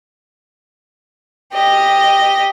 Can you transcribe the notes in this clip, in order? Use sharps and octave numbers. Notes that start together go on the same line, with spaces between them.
G4 D#5